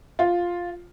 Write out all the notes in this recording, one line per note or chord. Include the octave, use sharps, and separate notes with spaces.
F4